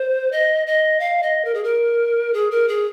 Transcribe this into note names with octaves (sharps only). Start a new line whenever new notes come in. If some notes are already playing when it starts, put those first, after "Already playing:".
Already playing: C5
D#5
D#5
F5
D#5
A#4
G#4
A#4
G#4
A#4
G#4